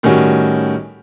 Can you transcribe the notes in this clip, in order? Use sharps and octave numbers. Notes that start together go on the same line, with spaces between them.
A2 D#3 G3 C#4 F#4